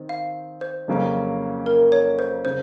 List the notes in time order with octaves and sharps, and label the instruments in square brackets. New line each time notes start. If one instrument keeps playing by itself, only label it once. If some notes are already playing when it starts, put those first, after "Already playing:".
Already playing: [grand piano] D#3 C4
[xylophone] F5
C5
[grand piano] F2 C#3 F#3 A#3 C#4
[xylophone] A#4
C#5
C5
[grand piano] C#3 [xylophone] C5